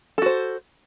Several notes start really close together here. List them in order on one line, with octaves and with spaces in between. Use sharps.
A4 F#4 C5